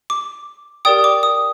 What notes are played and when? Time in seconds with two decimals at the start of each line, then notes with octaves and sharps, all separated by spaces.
0.10 D6
0.85 G4 A#4 D5 G5 D#6
1.04 D6
1.23 D#6